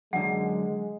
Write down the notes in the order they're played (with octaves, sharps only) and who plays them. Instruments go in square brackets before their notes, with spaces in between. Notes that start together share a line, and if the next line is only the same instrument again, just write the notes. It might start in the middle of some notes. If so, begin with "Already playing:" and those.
[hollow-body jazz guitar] F#2 D3 [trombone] G#3 [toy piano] F#5